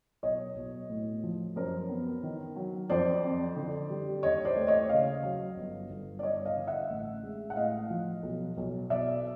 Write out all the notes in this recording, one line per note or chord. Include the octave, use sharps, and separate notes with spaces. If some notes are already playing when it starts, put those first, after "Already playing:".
B1 C#5 D#5
B1
A2
F3
F#2 A#4 C5
B3
D#3
F#3
F2 C5 D5
C4
D3
G3
D#2 C#5 D#5
C5 D5
A3
C#5 D#5
C#3 D#5 F5
F#3
G1
G1
D5
G2 C#5 D#5
D#5 F5
D3
E5 F#5
A1
G#3
F#5
A2 D#5 F5
F3
B1
B1
B2 D5 E5